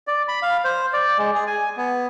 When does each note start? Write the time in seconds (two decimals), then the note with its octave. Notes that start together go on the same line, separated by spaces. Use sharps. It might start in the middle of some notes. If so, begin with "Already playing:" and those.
0.07 D5
0.28 B5
0.42 F5
0.64 C5
0.93 D5
1.18 G#3
1.34 G#4
1.47 G#5
1.77 B3